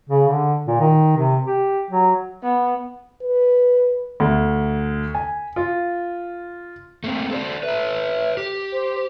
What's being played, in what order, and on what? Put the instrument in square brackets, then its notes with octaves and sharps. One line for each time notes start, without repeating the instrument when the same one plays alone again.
[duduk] C#3
D3
A#2
D#3
C3
G4
F#3
[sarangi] B3
[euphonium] B4
[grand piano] D2
G#5
F4
[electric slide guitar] A3 A#3 C4
A4 C5 D5
[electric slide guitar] A4 B4 [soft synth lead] E5
[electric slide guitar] G4
[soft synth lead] C5